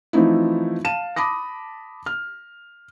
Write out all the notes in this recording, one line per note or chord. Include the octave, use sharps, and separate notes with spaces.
E3 F3 A3 C4 D#4 E4
F5 A5 D#7 E7
A5 B5 D6 D#6 A#6
F6